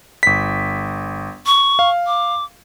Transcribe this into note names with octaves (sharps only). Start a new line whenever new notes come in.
G1 B6
C#6
F5
D6